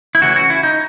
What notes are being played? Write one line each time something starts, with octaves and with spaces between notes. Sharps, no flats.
E4
C#3 E3 A3 C#4 F#4
F#4
E4
D#4